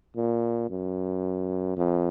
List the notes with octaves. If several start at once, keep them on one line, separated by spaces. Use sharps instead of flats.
A#2
F#2
F2